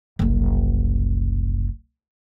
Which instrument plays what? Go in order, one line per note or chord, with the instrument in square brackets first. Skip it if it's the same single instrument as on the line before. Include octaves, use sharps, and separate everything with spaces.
[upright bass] F#1 C2